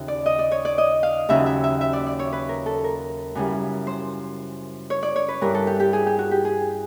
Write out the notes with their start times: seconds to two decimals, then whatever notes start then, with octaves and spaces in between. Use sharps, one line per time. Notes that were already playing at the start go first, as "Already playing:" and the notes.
Already playing: D#2 C#3 F3 E5
0.08 D5
0.26 D#5
0.39 D5
0.52 C#5
0.65 D5
0.78 D#5
1.03 F5
1.29 D#2 C#3 F#3 E5
1.46 E5
1.64 E5
1.81 E5
1.93 D5
2.06 D5
2.19 C#5
2.33 B4
2.49 A#4
2.66 A4
2.84 A#4
3.35 F#2 C#3 E3 G3
3.87 C5
4.90 C#5
5.03 D5
5.16 C#5
5.28 B4
5.41 G2 E3 G3 A#4
5.55 A4
5.67 G4
5.80 G4
5.93 G#4
6.06 G4
6.18 F#4
6.31 G4
6.45 G#4